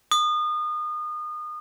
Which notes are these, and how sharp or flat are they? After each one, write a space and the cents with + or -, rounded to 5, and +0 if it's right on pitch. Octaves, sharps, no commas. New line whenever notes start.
D#6 -30